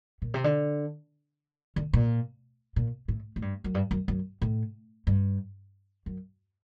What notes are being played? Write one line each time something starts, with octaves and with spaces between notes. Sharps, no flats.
A#2
C3
D3
D3
A#2
A#2
A2
A2
G2
F#2
G2
F#2
F#2
A2
G2
F#2